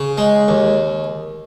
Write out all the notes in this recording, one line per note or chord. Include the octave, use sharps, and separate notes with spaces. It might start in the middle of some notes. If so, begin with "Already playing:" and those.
Already playing: C#3
G#3
D#2